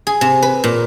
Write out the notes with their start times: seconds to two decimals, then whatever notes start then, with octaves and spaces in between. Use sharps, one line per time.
0.07 G#4
0.21 C3
0.43 B4
0.64 A#2